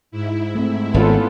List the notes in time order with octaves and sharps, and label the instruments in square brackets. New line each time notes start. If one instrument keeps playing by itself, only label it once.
[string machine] G#2 E4
[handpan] A3 C4
[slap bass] G#1 [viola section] B3 F4 A4 [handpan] C#4 C5